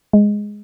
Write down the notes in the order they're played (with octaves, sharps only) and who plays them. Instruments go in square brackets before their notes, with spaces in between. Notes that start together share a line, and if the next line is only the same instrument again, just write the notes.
[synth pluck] G#3